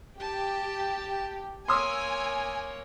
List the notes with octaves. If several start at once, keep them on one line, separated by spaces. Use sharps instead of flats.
G4 A5
A#3 C#5 G#5 C6 D#6 E6